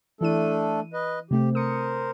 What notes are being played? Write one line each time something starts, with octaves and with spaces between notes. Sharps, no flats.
E3 A3 D4 E4 A4 D#7
B4 D#5
C3 A3 C4 G4
A#4 C5 D#6 C#7